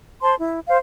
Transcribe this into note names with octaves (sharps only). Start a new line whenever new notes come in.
C5 A5 C6
E4
C5 F5